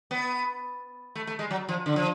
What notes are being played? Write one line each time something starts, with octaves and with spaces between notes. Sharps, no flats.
B3
A3
A3
G#3
F#3
F3
D3
F3